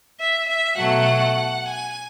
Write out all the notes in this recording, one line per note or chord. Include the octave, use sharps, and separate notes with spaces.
E5
E5
B2 F#3 A3 F#5
G#5